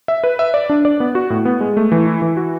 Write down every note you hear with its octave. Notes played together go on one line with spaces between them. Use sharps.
E5
B4
E5
D5
D4
D5
B3
F#4
A2
B3
G#3
A3
E3
E4
E3
F#4